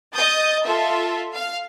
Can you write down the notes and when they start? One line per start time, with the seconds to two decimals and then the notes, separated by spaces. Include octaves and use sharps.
0.15 D#5 D#6 G6 A6
0.65 F4 A4 E5
1.35 F5